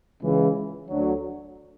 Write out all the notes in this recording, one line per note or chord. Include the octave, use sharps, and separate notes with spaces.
C#2 C#3 E3
D2 D3 F#3